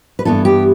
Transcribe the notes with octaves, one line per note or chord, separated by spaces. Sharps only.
B4
G2 E3 B3 E4 A4
G4